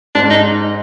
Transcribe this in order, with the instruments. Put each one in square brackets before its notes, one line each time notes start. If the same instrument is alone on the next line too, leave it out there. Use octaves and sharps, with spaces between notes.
[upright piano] G#2 [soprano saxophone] D4
[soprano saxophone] D#4